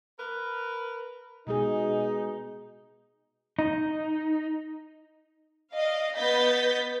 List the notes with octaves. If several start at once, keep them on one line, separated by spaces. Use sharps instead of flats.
A#4 B4
B2 G#3 D#4 G#4
D#4
D5 D#5 F5
B3 D#5 G6 A6 B6